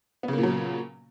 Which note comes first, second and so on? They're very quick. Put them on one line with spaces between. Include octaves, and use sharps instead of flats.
B3 C#3 A#3 A#2 F#3